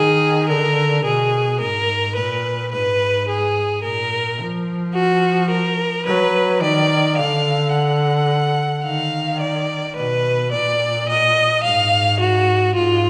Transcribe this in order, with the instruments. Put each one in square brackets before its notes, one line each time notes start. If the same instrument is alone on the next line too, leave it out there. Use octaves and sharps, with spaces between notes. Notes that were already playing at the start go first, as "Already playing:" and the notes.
Already playing: [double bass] D#3 [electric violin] G#4
[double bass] D3 [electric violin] A#4
[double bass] B2 [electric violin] G#4
[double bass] G#2 [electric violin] A#4
[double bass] A#2 [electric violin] B4
[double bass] G#2 [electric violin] B4
[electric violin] G#4
[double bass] A#2 [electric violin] A#4
[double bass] F3
[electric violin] F#4
A#4
[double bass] F#3 [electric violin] B4
[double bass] D#3 [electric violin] D5
[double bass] D3 [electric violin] F5
[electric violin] F#5
[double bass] D#3 [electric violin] F5
[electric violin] D5
[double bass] B2 [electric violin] B4
[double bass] A#2 [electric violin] D5
[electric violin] D#5
[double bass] G#2 [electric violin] F5
[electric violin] F#4
[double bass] G#2 [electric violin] F4